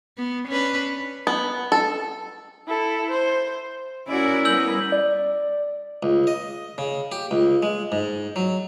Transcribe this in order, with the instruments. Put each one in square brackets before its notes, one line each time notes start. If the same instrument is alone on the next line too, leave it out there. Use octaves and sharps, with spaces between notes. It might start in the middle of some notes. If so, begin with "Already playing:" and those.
[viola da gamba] B3
C#4 D4 B4
[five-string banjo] B3
A4
[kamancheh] E4 A4
C5
[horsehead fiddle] C#4 A#4 [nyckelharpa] E4 [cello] F#4 D5
[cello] G3 B3 [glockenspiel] E6 G6 F#7
[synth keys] D5
[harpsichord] C#2
D#5
C#3
G4
C#2
G#3
G#2
F#3